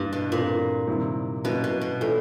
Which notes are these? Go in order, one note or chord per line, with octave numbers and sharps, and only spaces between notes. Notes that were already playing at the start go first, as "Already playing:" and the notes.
Already playing: G2 E3 G3 A#3
B2
A#2 E3 A3 C4 F4
C3 D#3 G3 C4 E4
B2 F#3 A#3 C#4 E4
B2
B2
A2 E3 A3 D4 F4